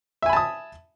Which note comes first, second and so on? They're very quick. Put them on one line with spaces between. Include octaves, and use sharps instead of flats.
E5 G#5 B5 A5 D#6